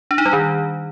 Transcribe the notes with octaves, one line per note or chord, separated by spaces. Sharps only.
D4
D#4
G3
D#3